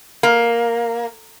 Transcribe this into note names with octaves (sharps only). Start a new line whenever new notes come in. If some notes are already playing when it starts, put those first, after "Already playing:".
A#3